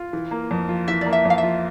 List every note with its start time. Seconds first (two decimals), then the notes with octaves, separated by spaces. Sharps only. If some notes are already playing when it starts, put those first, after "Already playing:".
Already playing: F4
0.13 E3
0.31 A#3
0.51 F2
0.69 F4
0.88 E3 E5
1.01 A#3 D5
1.13 E5
1.25 F2 F5
1.38 E5
1.43 F4